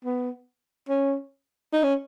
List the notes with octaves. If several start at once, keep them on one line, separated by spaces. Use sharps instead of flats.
B3
C#4
D#4
C#4